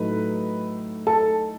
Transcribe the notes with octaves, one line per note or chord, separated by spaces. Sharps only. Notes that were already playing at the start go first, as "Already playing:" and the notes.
Already playing: A2 F#3 A3 D#4 B4
A4 A5